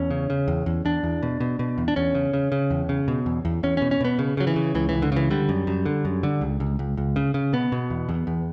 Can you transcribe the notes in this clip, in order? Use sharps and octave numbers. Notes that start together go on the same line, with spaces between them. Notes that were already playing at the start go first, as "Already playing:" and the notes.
Already playing: E2 C#4
C#3
C#3
E2
E2
E2 D4
E2
B2
B2
B2
E2
D4
E2 C#4
C#3
C#3
C#3
E2
C#3
B2
E2
E2
E2 C#4
B2 C#4
C#4
B2 B3
C#3
C#3 F#3
E3
C#3
C#2 E3
C#2 E3
D3
C#3 E3
D3 G3
F#2
F#2
D3
F#2
D3
C#2
C#2
C#2
C#2
C#3
C#3
B2 B3
B2
E2
E2
E2